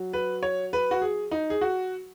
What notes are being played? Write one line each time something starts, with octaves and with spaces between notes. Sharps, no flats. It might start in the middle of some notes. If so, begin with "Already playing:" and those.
Already playing: F#3
B4
C#5
B4
F#4
G#4
D#4
G#4
F#4